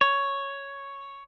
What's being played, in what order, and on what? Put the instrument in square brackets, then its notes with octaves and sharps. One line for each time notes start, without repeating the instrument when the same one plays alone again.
[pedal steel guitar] C#5